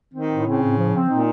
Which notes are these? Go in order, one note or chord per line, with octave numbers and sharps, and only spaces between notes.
D#3 C4
A2
C#3 C4
A2
F3
C4
A#2 D#4